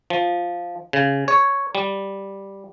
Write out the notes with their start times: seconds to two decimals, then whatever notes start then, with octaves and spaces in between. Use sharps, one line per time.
0.10 F3
0.93 C#3
1.28 C#5
1.75 G3